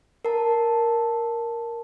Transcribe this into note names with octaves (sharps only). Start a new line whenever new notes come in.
A#4 A5